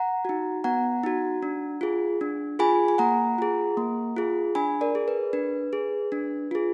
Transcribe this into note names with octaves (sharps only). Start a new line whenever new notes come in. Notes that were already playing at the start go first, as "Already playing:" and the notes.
Already playing: F#5 A#5
D#4 F#4
B3 F#5 A#5
D#4 F#4
D4
F4 G#4
D4
F4 G#4 G#5 B5
G#5
A#3 F#5 A#5
F4 G#4
A#3
F4 G#4
D4 G#5 B5
A#4 D5
G#4
B4
D4 B4
G#4
D4
F4 G#4